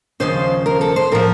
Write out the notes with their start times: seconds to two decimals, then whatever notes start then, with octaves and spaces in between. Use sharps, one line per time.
0.20 D#2 C#3 F3 C5
0.66 A#4
0.81 A4
0.96 C5
1.12 A2 F3 A#4